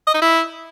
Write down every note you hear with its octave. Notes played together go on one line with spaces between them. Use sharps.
D#5
D#4
E4